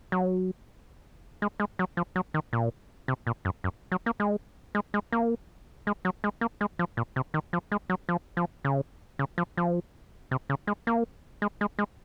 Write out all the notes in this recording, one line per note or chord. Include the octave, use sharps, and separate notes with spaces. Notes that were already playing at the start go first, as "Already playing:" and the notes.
F#3
G#3
G#3
F#3
F3
F#3
D#3
A#2
C3
A#2
F#2
F#2
F#3
A#3
G#3
G#3
G#3
A#3
G#3
F#3
G#3
A#3
G#3
F3
A#2
C3
D#3
F3
G#3
F#3
F3
F3
C#3
C#3
F3
F3
C3
C#3
G#3
A#3
G#3
G#3
G#3